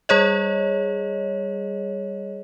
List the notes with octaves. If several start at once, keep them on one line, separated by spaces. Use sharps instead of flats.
G3 G#4 C#5 D#5